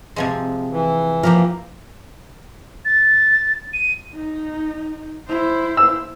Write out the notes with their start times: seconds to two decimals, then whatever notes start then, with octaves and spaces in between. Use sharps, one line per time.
0.16 C3 F3 G#3
0.71 E3
1.23 F3 A#3 G4 A#4
2.85 A6
3.73 D#7
4.15 D#4
5.29 E4 C5
5.77 E6